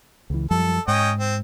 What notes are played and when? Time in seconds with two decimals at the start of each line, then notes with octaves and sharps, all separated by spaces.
0.30 C#2 E3
0.51 F#2 F3 G3 A4
0.88 G#2 C#4 D#5 G5
1.19 C4